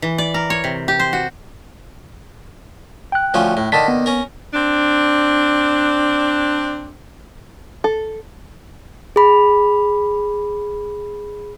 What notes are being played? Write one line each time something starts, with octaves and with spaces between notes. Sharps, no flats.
E3
D5
A#4
C#5
C3
G4
C5
F#4
G5 F#6
D2 F3 C#4
A2
D3 D#3 A5 B6
B3
C#4 A#4
C4 D4
A4
G#4 B5